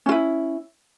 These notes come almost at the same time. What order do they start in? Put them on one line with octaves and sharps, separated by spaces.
C#4 F4 E4